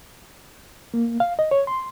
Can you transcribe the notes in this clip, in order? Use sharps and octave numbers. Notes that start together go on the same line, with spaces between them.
A#3
F5
D#5
C#5
C6